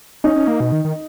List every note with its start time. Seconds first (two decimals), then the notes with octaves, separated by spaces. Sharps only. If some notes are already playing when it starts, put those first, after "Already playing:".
0.24 C#4 D#4
0.36 C#4
0.48 A#3
0.60 B2
0.72 D#3
0.85 D#3